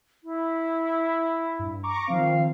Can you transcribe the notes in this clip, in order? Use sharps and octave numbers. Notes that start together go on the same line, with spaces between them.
E4
G2
A#5 C#6 D6
D#3 F3 C4 F5